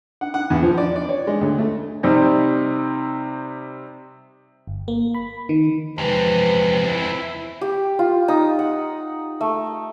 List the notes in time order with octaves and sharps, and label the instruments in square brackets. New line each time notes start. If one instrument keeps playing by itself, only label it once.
[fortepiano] F#5
F#5
E2
F3
D5
D5
C#5
G#3
D2
A3
[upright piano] C3 G3 C4 D#4
[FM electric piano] G1
A#3
B5
D#3
[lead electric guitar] E2 C4 [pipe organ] C3 F3 G#3 [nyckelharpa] B4
[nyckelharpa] E4
[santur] G4
F4
D#4
F#5
A3